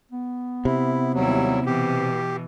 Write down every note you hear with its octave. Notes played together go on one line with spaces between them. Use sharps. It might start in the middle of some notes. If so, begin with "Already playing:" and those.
B3
C3 E4
D#2 F#3 G3 E4
B2 E3 G4